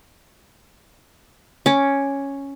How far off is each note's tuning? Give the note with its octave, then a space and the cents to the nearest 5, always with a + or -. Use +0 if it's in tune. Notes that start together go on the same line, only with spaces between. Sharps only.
C#4 +0 D6 +0